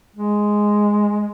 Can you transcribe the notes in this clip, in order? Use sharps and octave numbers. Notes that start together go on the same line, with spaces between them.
G#3